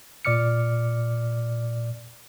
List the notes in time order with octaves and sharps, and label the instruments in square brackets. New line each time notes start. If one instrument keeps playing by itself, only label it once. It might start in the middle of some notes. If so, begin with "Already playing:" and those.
[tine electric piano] A#2 D5 D6 F6 C#7